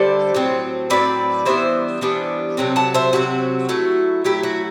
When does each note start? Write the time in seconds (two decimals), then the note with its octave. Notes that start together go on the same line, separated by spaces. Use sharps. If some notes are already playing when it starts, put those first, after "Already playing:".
Already playing: D3 G3 D4 A4 C5
0.35 A2 F#3 C4
0.90 A2 F#3 C4 B4 D5
1.45 E3 G3 B3 D4 C5 E5
2.01 E3 G3 B3 D4
2.57 C3 F#3 A3 C4
2.76 F#5 A5
2.94 C5 E5
3.13 C3 F#3 A3 C4 F#4
3.69 F#3 A3 E4
4.24 F#3 A3 E4 G4
4.43 F#4